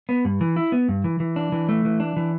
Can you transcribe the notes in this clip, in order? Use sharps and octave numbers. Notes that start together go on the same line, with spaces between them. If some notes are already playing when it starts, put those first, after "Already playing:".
B3
G2
E3
E4
B3
G2
E3
E3
D4
E3
A3
E3
D4
E3